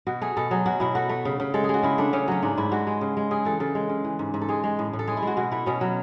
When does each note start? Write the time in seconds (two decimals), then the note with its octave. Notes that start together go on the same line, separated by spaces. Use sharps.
0.07 B2 F#4
0.22 A3 G#4
0.37 B2 A4
0.51 F#3 G#4
0.66 B2 F#4
0.80 B2 E4
0.95 A3 F#4
1.09 A3
1.25 C#3
1.40 C#3
1.54 G#3 A4
1.64 G#4
1.69 G#3 F#4
1.83 C#3 E4
1.98 A3 D4
2.13 C#3 C#4
2.28 F#3 C#4
2.42 G#2 D4
2.57 G#2 E4
2.71 G#3 F#4
2.87 G#3
3.01 C#3
3.17 G#3
3.31 C#3 G#4
3.45 E3 A4
3.60 C#3 A4
3.75 G#3
3.89 C#3
4.04 E3
4.19 G#2
4.34 G#2
4.42 A4
4.49 G#3 G#4
4.64 G#3
4.79 A2
4.93 A2
4.99 A4
5.07 G#3 G#4
5.17 E4
5.22 G#3 F#4
5.37 B2 F#4
5.51 A3 E4
5.66 B2 C#4
5.81 F#3